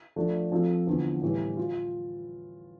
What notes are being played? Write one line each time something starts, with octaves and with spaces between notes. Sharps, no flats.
F3 A3 D4 A4
F3 C4 F4 A4
E2 D3 F3 B3
A2 E3 G3
F4